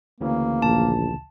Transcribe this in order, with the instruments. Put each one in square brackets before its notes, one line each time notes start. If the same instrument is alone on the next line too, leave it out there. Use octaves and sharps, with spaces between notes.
[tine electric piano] D2 C#3 E3 [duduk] A#3
[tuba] A#1 [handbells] A5